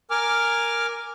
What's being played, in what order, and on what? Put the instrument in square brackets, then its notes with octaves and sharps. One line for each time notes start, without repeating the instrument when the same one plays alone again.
[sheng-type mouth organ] A#4 G#5 D6 F6